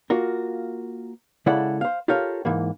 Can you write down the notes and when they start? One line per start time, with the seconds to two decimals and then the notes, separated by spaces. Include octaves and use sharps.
0.10 A#3 F4 F#4 A#4
1.46 C#3 G#3 E4 A4 D5 F#5
1.81 C5 F5
2.08 F4 G4 A4 A#4 C#5 F5
2.45 G#2 E3 A#3